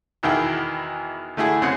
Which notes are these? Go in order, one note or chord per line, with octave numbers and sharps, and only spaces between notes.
E2 B2 D#3 E4 G#4 G5
D3 A3 E4 G#4
F#2 C#3 C4 G#4 F#5